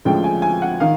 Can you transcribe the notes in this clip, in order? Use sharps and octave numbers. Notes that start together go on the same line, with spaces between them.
D2 C#3 F3 G#3 G5
G#5
G#5
F#5
D#3 F5